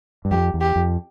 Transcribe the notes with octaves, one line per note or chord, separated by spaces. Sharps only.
G2
F2 G4
E2
G4
F2